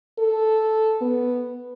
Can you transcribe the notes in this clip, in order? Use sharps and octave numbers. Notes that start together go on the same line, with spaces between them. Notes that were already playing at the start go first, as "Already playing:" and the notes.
A4
B3